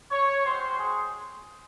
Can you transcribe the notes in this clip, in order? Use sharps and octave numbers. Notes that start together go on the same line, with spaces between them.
C#5
G#3 C4 F#4 C5
G#4